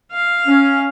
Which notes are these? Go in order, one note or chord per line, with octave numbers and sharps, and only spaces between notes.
F5
C#4